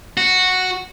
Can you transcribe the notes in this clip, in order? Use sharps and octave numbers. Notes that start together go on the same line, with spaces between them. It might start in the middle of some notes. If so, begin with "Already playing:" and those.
F#4